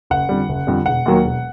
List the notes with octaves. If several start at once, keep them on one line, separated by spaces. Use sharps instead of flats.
F#1 F#5
F2 D3 G3
F#1
F2 D3 G3
E1 F#5
D#2 D#3 F#3 A#3
E1